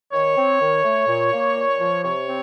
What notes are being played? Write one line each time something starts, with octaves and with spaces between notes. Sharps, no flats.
D#3 C#5
C4
D#3
A3
A#2
A#3
A#2
F3
C3 C#5
C4